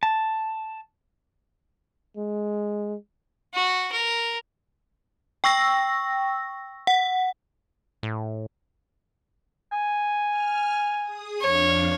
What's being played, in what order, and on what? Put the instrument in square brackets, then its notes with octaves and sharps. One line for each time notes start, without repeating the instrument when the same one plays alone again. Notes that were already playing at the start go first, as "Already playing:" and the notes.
[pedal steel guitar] A5
[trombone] G#3
[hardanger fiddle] F#4
A#4
[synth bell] G5 C#6 E6 A#6
F#5
[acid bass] A2
[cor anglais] G#5
[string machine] F6
G#4 D#6
[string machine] F2 D4 F5 [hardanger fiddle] C#5